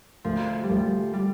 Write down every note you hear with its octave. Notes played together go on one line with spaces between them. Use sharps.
D2 F3
G3
D2 F3
G3